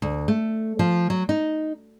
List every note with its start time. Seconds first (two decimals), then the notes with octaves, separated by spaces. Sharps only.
0.02 D2
0.28 A3
0.79 F3
1.10 F#3
1.29 D#4